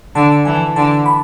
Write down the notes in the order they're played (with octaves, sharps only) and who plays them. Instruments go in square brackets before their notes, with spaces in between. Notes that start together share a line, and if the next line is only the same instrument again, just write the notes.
[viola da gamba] D3 [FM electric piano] A5
[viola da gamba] E3 [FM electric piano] G#5
[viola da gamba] D3 [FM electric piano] A5
[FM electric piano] B5